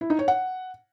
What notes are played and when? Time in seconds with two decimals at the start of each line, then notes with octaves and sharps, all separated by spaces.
0.01 E4
0.10 D#4
0.19 C#5
0.28 F#5